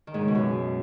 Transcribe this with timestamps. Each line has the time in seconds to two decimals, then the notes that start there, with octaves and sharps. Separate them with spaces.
0.07 D#3
0.14 G#2
0.21 C#3
0.28 B2
0.35 F#2